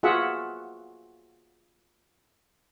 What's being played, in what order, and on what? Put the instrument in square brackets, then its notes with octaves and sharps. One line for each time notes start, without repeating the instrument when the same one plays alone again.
[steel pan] F4 F#4 G#4 E5 F#5